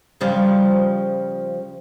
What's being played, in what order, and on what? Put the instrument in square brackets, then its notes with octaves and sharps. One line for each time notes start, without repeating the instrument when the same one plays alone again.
[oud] C#3 F3 G3